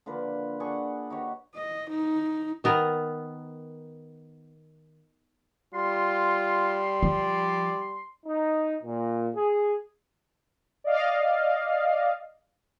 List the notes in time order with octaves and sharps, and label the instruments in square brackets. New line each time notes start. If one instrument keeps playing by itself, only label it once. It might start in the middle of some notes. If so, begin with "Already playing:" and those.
[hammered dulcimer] D3 F3 A#3 B4
D4 G#4 F#5 C#6
D#4 F#4 G4 C#5
[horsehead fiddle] D#5
D#4
[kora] D#3 B3 A#4
[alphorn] G3 [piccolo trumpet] F4 [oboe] C6
[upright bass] F3 [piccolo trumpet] D5
[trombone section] D#4
A#2
G#4
[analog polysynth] D5 D#5 F5